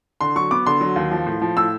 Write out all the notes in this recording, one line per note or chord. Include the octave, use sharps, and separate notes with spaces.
D3 C6
F#3 C#6
B3 D6
D3 C6
F#3
D#2
F3
A2
F3
A2 E6